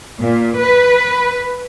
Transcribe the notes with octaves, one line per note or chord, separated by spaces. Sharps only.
A#2
B4